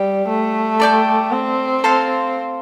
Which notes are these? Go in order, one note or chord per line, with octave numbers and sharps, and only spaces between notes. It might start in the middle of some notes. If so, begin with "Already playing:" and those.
Already playing: G3 G5
A3
A4 D5 G5 D6
C4
A4 C5 F5 C6